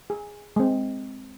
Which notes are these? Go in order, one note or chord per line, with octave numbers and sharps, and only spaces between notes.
G#4
G#3 C4